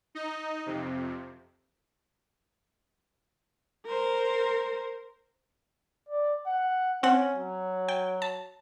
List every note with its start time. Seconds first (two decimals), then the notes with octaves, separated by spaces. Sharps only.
0.15 D#4 D#5
0.66 F2 C3
3.86 A#4 C5
6.09 D5
6.47 F#5
7.03 C4 C#4 F#5
7.36 F#3
7.88 G5
8.22 A5